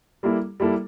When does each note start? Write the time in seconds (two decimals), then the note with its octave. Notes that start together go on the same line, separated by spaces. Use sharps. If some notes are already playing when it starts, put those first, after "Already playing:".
0.23 G3 A#3 E4 A4
0.60 G3 A#3 E4 A4